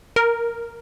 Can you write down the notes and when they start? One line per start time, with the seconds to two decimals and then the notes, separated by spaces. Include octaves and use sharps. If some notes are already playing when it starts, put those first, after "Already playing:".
0.16 A#4